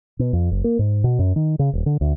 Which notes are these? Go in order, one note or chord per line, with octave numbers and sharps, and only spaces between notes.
B2
F2
F#1
A#3
G#2
B2
F#2
D#3
C#3
D#1
D3
D2